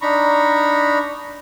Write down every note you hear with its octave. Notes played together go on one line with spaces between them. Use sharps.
D4 D#4 A#5 B5 C#6